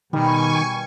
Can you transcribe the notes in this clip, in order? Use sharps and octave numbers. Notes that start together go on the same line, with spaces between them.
B2 D#3 G3 G#5 C#6